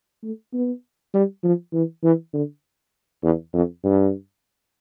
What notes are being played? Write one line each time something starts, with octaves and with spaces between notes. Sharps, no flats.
A3
B3
G3
F3
E3
E3
D3
E2
F2
G2